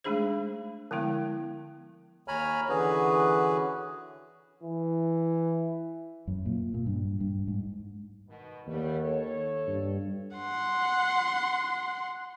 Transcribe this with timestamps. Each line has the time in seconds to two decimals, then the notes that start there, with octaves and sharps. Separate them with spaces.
0.04 G#3 A3 D4 D#4 G#4 C5
0.91 D3 F3 G#3 B3 E4
2.28 D#2 C#5 G#5 A#5 B5 F6
2.69 D3 E3 C#4 F#4 G#4 B4
4.63 E3
6.27 F#2
6.45 A#2
6.74 A#2
6.86 G2
7.20 G2
7.48 G#2
8.28 B2 D#3
8.67 D#2 G3 A3 B3
9.00 A4 C#5
9.67 G2
10.37 F#5 C6